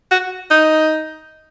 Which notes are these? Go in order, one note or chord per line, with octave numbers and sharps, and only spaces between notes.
F#4
D#4